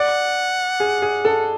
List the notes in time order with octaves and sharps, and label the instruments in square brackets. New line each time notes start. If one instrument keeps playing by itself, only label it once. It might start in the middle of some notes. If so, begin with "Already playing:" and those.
Already playing: [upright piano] D5 [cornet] F#5
[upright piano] G#4
G#4
A4